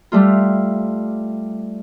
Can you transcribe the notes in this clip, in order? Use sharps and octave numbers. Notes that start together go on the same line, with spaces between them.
G3 A3 F4